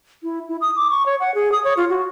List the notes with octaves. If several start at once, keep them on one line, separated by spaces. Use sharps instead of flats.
E4
E4
D#6
D6
C#6
C#5
F#5
G#4
D#6
C#5
F4
F#4